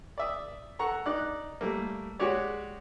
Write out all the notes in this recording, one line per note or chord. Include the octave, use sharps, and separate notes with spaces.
D5 E5 D#6
A4 F#5 A#5 C#6
D#4 D5 F#6
G3 A3 A#3
G#3 F#4 G4 C#5 D5